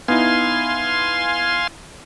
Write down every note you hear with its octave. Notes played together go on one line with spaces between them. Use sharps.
B3 D#4 E4 F5 G#5 C6